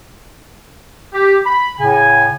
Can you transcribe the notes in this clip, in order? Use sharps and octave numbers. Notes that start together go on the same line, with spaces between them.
G4
B5
A2 C#3 G#5